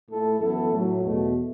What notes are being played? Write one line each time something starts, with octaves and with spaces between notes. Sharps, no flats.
A2 A3 E4 A4
F#2 E3 B3 E4 A4
A2 F#3 A3
E2 B2 A3